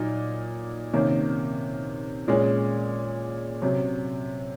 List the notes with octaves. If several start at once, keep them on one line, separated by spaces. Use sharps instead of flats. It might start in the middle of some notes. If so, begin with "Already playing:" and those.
Already playing: A#2 F#3 A#3 D#4
C3 D#3 A#3 C#4
A#2 G#3 C#4
C3 F#3 C#4